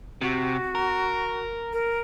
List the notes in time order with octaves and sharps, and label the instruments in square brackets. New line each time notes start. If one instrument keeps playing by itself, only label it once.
[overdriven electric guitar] C3 [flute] F#4
[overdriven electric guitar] A#4
[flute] A#4